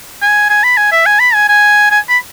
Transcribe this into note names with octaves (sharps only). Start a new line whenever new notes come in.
G#5
G#5
B5
G#5
E5
G#5
B5
G#5
G#5
G#5
B5